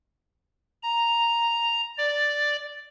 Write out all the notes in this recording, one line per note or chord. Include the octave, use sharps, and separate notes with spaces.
A#5
D5